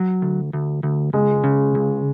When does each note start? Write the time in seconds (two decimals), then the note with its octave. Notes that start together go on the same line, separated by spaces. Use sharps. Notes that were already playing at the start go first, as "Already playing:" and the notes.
Already playing: F#3
0.22 D2
0.53 D2
0.83 D2
1.13 C#2 G#3
1.44 C#3
1.75 C#2